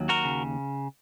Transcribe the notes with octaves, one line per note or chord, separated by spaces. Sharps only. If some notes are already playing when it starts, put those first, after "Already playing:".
Already playing: D#2 F#3
F#4 A#4
C#3